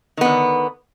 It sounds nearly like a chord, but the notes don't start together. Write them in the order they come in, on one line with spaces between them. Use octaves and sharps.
D#3 B3 D3